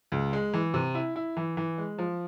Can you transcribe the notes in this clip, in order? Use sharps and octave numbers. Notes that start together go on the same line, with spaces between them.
C#2
G#3
E3
C3
E4
E4
E3
E3
G#3
F3